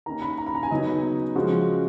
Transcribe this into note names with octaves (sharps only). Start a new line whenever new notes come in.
D#3 A#3 C#4 A#5
B5
A#5
B5
A#5
G#5
C#3 F#3 B3 D#4 D#5
C#3 F3 G#3 C#4 F#4